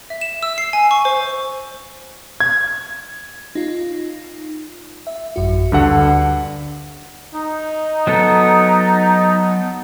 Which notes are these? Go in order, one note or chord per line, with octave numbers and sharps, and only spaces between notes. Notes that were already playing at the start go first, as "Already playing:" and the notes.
E5
E7
E6
C7
G#5
C#6
C5
G#6
D#4 F4
E5
A1 F#2 F#4
D2 G2 D3 F#5
D#4
F#3 B3 A4